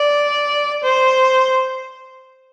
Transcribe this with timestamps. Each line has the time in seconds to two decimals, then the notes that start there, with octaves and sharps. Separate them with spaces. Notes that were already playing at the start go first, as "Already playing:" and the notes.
Already playing: D5
0.84 C5